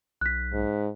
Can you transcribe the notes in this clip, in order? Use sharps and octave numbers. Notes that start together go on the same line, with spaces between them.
B1 F#6 B6
G#2